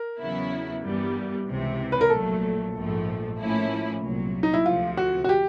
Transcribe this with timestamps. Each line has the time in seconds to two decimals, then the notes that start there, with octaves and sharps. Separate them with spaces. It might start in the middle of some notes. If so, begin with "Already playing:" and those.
Already playing: A#4
0.19 E2 C#3 F#3 B3 E4
0.83 G2 E3 G3 B3
1.46 C#2 C3 E3
1.92 B4
2.01 A#4
2.10 A#1 A#2 F#3 A3 A4
2.74 A#1 G#2 F3 A3
3.38 A2 F3 A#3 C#4 E4
4.01 C2 A#2 F#3
4.43 D#4
4.54 E4
4.65 D2 C3 F3 F4
4.97 F#4
5.24 F#4
5.29 G4